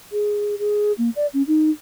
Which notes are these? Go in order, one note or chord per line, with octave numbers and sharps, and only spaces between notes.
G#4
G#4
A#3
D5
C#4
D#4